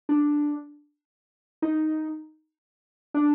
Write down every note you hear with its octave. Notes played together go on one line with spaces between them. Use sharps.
D4
D#4
D4